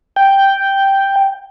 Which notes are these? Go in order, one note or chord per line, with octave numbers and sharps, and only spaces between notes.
G5